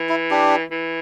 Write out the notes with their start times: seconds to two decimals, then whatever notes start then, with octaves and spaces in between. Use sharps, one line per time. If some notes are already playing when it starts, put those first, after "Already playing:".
Already playing: E3
0.09 E4
0.31 D4 G4
0.72 E3